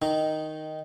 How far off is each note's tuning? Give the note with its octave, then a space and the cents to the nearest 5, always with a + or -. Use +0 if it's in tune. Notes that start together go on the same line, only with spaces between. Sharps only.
D#3 +0 D#4 +0 A#5 -5